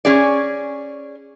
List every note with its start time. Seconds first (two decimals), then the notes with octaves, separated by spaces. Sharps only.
0.05 C#4 G#4 D5